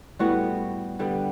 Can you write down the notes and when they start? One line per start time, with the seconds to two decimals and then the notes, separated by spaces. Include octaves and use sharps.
0.19 A2 G3 B3 F#4
0.99 D3 G3 B3